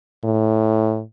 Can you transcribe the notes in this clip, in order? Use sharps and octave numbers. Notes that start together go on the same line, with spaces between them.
A2